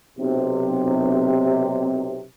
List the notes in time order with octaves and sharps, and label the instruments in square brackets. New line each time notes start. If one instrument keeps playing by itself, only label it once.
[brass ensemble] B1 C3